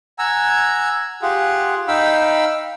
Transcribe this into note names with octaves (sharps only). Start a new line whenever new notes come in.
F#5 G#5 A#5 E6
F4 G4 G#4 F#5
D#4 F5 G5 B5 E6